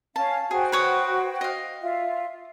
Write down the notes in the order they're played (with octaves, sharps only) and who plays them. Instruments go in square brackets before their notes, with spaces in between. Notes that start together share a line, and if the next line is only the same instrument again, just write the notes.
[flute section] C#4 F5 [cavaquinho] A5
[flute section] F#4 C5 G5 [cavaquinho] G#4
[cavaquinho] B4 C#5 D#6
D#5 F5
[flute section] F4 E5